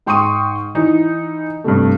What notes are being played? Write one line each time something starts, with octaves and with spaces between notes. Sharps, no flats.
G#2 G5 C6 C#6 D#6 D#7
E3 D#4
G2 C3 A3